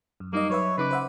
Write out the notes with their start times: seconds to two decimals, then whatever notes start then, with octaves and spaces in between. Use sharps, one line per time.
0.20 F#2
0.33 G3 A#3 D#4 D#5
0.50 F#3 B4 C#5 E5
0.78 C#3 D#4 B4 D6
0.91 C5 E5 F#5